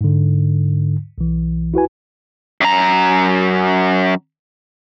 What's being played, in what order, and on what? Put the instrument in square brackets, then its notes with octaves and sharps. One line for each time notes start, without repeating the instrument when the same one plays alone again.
[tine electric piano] G#2 D3
B1 E3
E4 F#4 B4 G#5
[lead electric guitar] F#2 A#5